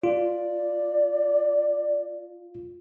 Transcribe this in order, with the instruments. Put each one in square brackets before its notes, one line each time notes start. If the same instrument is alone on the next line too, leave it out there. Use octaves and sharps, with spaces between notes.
[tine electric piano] F4 [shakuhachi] D5